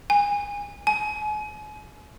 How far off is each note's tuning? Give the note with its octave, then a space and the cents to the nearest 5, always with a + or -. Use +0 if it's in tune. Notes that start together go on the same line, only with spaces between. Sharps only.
G#5 -25
G#5 +35